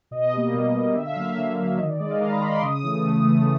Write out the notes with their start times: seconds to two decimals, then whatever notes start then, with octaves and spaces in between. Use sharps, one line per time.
0.11 B2 D#5
0.33 G3 A#3
0.54 B2
0.75 G3 A#3
0.95 D3 E5
1.05 F5
1.16 F#3 A#3 E5
1.38 D3
1.58 F#3 A#3
1.78 D#3 D#5
1.89 D5
1.99 G#3 D#5
2.11 F5
2.21 D#3 A#5
2.31 B5
2.41 G#3 C6
2.52 D6
2.62 C#3 D#6
2.84 E3 A3
3.05 C#3
3.24 E3 A3